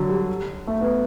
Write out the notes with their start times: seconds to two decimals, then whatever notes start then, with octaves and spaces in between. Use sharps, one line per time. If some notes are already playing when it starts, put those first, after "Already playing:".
Already playing: D3 F#3
0.09 G3
0.67 A3
0.81 B3